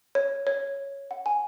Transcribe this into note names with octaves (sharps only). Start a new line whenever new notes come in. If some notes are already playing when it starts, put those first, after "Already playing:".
C#5
C#5
F#5
G#5